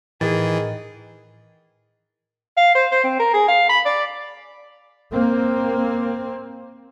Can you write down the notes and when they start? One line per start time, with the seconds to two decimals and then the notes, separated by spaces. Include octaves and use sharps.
0.21 A2 D#3 E3 G#4 A6
2.57 F5
2.75 C5
2.91 C5
3.04 C4
3.20 A#4
3.34 G#4
3.49 F5
3.69 B5
3.86 D5
5.12 A#3 C4